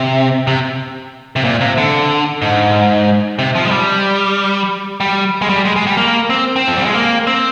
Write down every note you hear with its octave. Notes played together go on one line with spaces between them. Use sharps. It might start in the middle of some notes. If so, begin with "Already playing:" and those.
Already playing: C3
C3
C3
A#2
C3
D3
G#2
C3
F3
G#3
G3
G3
G#3
G3
G#3
G#3
G3
A#3
C4
C4
F3
G3
G#3
A#3
C4